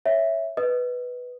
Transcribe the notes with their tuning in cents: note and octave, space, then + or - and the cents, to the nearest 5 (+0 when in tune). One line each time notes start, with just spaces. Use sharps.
C#5 -5 E5 +0
B4 +0 D#5 +0 D#6 -5